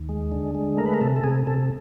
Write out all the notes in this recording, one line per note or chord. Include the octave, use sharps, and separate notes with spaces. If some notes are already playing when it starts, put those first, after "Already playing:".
Already playing: D#2
G#3
D3
G#3
A3 A#4
B4
A#4
C3 A4
A4
C3 G#4
C3 A4